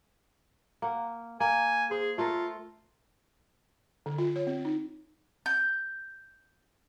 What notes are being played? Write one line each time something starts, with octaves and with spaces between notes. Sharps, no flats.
A#3 F#5
A#3 G#5
G#4 C5
A3 F4 A4 A#4
D3
F4
C#5
C4
D#4
G6